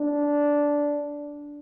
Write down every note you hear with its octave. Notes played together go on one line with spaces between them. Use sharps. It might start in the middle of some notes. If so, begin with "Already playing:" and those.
Already playing: D4